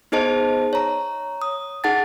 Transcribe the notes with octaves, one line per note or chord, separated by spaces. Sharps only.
B3 D#4 G#4 C5 D#5 A5
C#5 A#5
D#6
D#4 G#4 F#5 A5 A6